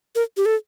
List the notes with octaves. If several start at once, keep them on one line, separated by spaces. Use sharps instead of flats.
A#4
G4
A4